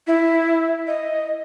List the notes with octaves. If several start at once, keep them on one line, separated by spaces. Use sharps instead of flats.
E4
D#5